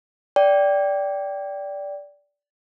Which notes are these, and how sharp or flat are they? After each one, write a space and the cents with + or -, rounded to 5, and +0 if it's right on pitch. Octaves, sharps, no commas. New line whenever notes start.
D5 -15 G5 -5